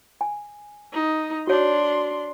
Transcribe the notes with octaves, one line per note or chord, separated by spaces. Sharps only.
G#5
D#4
D4 F#4 C#5 C6